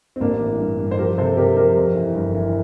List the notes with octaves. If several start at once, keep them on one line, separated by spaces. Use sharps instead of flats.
C4
A1 A#3 D4
E3
G2
G2
C5
F3 G4 A#4
C3 A4 C5
C3 G4 A#4
F3 G4 A#4
F2
E3
G1
E3